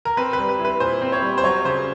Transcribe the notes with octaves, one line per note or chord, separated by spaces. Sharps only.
A#4
C4 B4
B4
G3
B4
E4
B4
A#2 C5
C4
C#5
G3
C5
F#3 C#5
C#3 C5